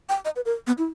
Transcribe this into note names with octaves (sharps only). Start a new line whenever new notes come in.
G5
D#5
B4
A#4
B3
E4